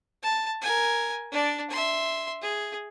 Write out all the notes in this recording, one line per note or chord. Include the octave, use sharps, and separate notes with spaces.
A5
A#4 G#5
D4 D5
E5 C6
G#4